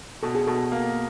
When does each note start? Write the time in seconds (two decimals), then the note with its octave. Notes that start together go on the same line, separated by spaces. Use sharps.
0.23 B2 A4
0.35 G#4
0.47 B2 A4
0.72 A#3